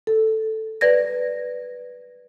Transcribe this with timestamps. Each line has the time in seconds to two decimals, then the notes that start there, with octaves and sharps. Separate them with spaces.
0.07 A4
0.81 B4 D5 G#6 A#6